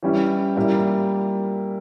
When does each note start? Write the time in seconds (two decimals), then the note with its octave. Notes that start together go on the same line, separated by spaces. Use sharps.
0.03 E3 G3 C#4 E4
0.57 A#2 G3 A#3 E4